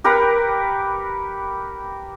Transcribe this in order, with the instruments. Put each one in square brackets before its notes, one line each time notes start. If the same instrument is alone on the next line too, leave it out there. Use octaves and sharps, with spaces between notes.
[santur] G4 A#4 B4 F#5